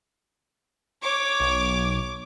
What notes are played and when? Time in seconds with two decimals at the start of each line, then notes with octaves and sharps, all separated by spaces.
1.02 C#5 D6
1.40 B1